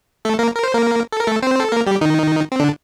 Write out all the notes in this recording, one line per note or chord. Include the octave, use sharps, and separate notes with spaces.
A3 A4
A#3 A#4
A#4
C5
A#3 A#4
A4
A#4
A3 A4
C4 C5
A4
A#3 A#4
G3 G4
D#3 D#4
C4
D3 D4